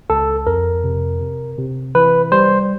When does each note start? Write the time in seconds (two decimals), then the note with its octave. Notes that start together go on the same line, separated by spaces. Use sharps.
0.10 C#2 A4
0.46 F2 A#4
0.84 C3
1.21 C3
1.58 C3
1.95 E3 B4
2.32 G3 C5